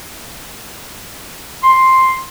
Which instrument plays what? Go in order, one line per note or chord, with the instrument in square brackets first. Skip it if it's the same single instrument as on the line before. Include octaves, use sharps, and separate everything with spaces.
[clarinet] C6